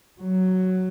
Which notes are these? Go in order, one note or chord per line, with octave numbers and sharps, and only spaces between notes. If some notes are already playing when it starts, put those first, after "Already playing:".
F#3